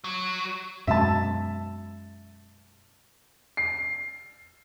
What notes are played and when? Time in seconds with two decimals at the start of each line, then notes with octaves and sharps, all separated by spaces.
0.04 F#3
0.87 F#2 B2 G#3 E5 A5
3.57 C7